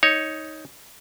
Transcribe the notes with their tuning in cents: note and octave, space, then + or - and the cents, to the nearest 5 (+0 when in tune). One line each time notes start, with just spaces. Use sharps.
D#4 +10 C#5 +0